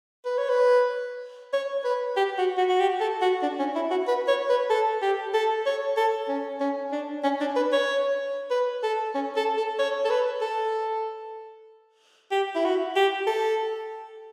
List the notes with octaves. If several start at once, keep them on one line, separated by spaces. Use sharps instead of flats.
B4
C#5
B4
C#5
B4
G4
F#4
F#4
F#4
G4
A4
F#4
D4
C#4
E4
F#4
B4
C#5
B4
A4
G4
A4
C#5
A4
C#4
C#4
D4
C#4
D4
B4
C#5
B4
A4
C#4
A4
A4
C#5
A4
B4
A4
G4
E4
F#4
G4
A4